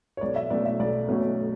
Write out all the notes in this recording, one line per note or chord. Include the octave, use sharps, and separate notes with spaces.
C#5
B1 D5
E5
B2 F#3 A3 C#4 D5
E5
B1 D5
B2 F#3 A3 C#4